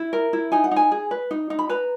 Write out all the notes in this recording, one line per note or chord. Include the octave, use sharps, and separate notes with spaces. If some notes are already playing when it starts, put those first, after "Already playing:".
Already playing: E4
A#4
E4
D#4 G#5
F#5
D#4
G#5
G#4
B4
D#4
D#4
B5
B4 A#5